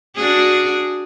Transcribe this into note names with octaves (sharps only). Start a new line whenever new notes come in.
D4 F#4 G#4